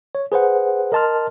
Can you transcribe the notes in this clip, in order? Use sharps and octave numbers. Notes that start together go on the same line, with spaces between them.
C#5
G#4 B4 C5 F#5
A#4 D#5 A5 C6 F6